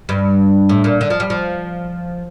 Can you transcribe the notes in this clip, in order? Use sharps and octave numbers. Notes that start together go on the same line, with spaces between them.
G2
A2
A#2
D3
F3
G3
F3